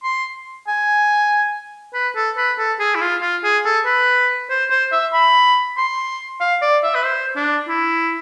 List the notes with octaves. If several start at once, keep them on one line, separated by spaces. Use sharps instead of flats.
C6
G#5
B4
A4
B4
A4
G#4
E4
F4
F4
G#4
A4
B4
C5
C5
E5
B5
C6
F5
D5
E5
B4
C5
D4
E4